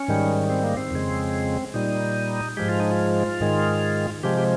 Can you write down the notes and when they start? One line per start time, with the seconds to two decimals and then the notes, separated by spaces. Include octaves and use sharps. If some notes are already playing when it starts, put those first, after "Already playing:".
Already playing: C#4
0.08 G#2 D#3 G3
0.50 C4
0.63 A#3
0.77 C4
0.91 F2 C#3 G#3
1.74 A#2 G3 D#4
2.57 G#2 F3 G#3 G4
2.69 F4
2.80 D#4
2.91 F4
3.40 G#2 D#3 G#3
4.23 C3 F3 G#3 G4
4.37 G4